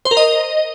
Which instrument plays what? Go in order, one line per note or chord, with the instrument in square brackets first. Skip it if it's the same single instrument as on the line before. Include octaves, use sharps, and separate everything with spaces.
[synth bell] C5
A#4
D#5